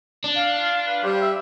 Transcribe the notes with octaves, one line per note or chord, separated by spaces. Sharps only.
D4
F5
F4
B4
G3 C5
E5